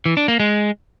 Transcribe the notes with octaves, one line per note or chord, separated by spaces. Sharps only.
E3
D4
A#3
G#3